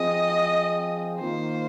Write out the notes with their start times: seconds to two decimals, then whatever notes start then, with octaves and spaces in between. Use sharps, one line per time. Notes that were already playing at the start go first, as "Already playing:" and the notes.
Already playing: F3 C4 G#4 D#5
1.19 D#3 A#3 F4 C5